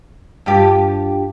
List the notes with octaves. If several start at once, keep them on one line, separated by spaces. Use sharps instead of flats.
G2 F4 G4